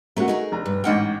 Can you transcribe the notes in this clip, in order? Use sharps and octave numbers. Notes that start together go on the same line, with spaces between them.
A3 C#4 F#4 A#4
D#4 G#4 A#4
F1 A#5
G2
A1 G#2 D#5 F#5 G5 F6